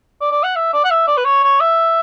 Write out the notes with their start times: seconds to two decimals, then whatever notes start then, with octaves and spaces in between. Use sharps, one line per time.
0.21 D5
0.31 D5
0.44 F#5
0.56 E5
0.73 D5
0.84 F#5
0.91 E5
1.07 D5
1.18 B4
1.25 C#5
1.43 C#5
1.61 E5